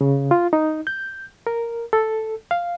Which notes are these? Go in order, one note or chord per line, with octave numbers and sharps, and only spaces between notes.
C#3
F4
D#4
G6
A#4
A4
F5